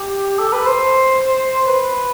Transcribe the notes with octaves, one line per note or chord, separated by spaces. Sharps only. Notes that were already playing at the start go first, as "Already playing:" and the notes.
Already playing: G4
A4
B4
C5
B4